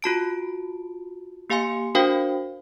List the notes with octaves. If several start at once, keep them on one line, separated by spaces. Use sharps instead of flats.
F4 F#4 A5 D7
A#3 G4 F5 G#5 C6 C#7
D4 F#4 A#4 C5 F5 G5